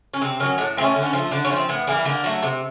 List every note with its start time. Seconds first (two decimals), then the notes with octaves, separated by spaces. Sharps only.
0.14 C#4
0.21 C3 C4
0.40 D#3 F#3 C#4
0.58 A2 D4
0.77 F3 C4
0.81 A3 C#4
0.96 D3
1.03 C#4
1.13 F3 C4
1.18 A3
1.31 D3 D4
1.45 C#4
1.50 F3 A3
1.57 C4
1.69 A2 B3
1.87 E3 G3 A#3
2.05 D3 A#3
2.24 F#3 A3
2.43 C3